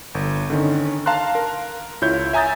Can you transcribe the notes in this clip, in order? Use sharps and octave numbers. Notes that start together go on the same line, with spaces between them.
G1
D3 D#3 C#4
F5 A5 A#5 C6 F#6
A#4
C#2 E4 F4 C#5 G6
E5 G#5 A#5 D#6 G6 A6